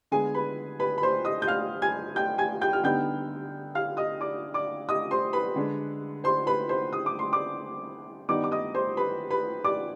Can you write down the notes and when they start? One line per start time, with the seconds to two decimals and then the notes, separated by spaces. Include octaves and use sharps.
0.11 D3 G#3 B3 G#4 G#5
0.34 B4 B5
0.80 B4 B5
0.98 B5
1.03 C5 C6
1.25 D#5 D#6
1.42 G6
1.47 F5 F6
1.82 G#5 G#6
2.16 G5 G6
2.38 G#5 G#6
2.61 G5 G6
2.73 F6
2.84 D3 G3 B3 D#4 G5 G6
3.75 F5 F6
3.97 D#5 D#6
4.20 D5 D6
4.54 D5 D6
4.89 D#5 D#6
5.11 C5 C6
5.33 B4 B5
5.56 D3 G#3 D4
6.24 C5 C6
6.47 B4 B5
6.69 C5 C6
6.93 D#6
7.06 D6
7.19 C6
7.32 D5 D6
8.29 G2 D#3 B3 D#4 D5 D6
8.44 D6
8.51 D#5 D#6
8.75 C5 C6
8.97 B4 B5
9.30 B4 B5
9.64 D5 D6